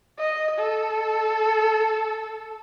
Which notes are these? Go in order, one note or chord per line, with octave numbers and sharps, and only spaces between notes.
D#5
A4